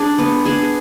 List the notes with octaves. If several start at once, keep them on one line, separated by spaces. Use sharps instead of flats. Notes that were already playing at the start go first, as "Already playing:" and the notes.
Already playing: D4 G#4
B3
D4 G#4